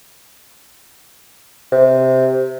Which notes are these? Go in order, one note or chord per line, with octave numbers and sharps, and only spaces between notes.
C3